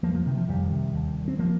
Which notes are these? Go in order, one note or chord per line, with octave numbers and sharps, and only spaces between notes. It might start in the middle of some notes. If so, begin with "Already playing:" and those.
F2 F3 A#3
F3
C3 D#3
F3
F2 D#3 G3
C3
D#2
C4
F3 A#3